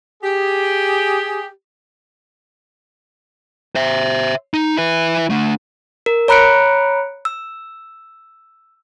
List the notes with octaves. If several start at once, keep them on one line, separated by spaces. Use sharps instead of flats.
G4 G#4
C5 E5
D#4
E4 B4
A3 D4
A#4
C#5 A#5 B5 F#6 C#7 D7
E6